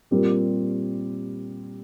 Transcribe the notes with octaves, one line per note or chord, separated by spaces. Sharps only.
A#2 G3 C4 G4 A#4